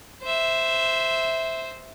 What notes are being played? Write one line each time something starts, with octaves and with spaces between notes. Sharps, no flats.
C5 E5